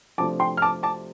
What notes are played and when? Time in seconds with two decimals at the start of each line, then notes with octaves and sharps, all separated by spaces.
0.18 C3 F3 A3 D4 F4 A5 D6
0.40 G5 C6
0.57 F6
0.62 A5 D6
0.83 A5 D6